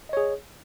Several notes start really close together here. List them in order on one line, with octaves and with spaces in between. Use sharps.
D#5 C#5 G#4